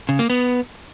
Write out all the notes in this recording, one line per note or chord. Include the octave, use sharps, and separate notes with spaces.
C#3
A#3
B3